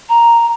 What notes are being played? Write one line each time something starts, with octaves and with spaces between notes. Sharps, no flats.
A#5